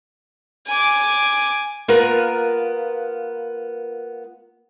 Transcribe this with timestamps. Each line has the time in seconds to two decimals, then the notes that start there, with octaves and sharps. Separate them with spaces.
0.67 G#5 D6
1.88 A#3 B3 F4 A#4 B4 A#5